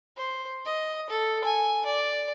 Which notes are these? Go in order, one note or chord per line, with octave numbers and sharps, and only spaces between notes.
C5
D#5
A4
G#5
D5